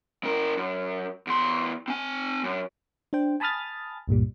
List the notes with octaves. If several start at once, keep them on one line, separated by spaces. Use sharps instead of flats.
C#3 A#4
F#2
E2 C6
C4 G#5
F#2
D4 C5 G5
G#5 A5 B5 D#6 F6 A6
C#2 G2 A#2 G3